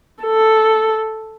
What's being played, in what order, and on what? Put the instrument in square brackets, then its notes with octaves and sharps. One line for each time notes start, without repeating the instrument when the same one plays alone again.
[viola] A4